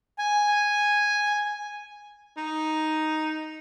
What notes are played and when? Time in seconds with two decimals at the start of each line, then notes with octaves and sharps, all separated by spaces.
0.19 G#5
2.37 D#4